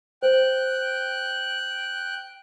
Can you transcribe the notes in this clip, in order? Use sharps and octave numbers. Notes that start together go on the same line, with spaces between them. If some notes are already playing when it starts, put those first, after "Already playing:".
C5 G5 F#6